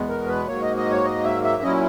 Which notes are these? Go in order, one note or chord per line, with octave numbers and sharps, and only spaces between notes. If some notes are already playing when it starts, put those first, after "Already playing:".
Already playing: E2 B2 G#3 B3
A#4
B4
G#2 F#3 A#3 C#5
D#5
D#5
C#5
D#5
E5
E5
A#2 F#3 C#4 E4 D#5